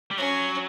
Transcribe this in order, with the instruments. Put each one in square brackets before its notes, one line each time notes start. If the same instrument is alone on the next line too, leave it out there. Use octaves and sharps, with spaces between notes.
[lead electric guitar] G3
[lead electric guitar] F#3 [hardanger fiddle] C#4